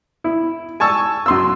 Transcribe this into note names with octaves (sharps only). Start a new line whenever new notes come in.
E4
G#5 A5 C#6 E6
F#2 C6 E6